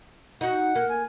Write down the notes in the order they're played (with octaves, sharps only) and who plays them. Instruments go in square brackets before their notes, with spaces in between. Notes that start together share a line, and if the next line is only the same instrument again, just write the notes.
[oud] D#4 F#4 [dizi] F#5
[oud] A#3
[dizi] G#5